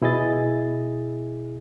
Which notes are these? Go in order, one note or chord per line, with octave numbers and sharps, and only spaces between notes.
B2 E4 G#4 D#5 A6